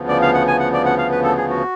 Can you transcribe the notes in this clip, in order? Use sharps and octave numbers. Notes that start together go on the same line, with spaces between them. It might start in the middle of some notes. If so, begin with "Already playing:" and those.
Already playing: D2 C#3 F3 B3
D5
F5
F#5
G#5
F#5
D5
F#5
F5
B4
A4
G#4
F#4